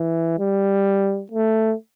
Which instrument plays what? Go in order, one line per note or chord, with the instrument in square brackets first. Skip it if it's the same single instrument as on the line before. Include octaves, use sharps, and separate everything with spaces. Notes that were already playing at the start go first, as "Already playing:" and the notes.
Already playing: [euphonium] E3
G3
A3